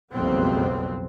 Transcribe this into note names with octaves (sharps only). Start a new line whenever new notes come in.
F#1 B1 F2 G3 B3 C4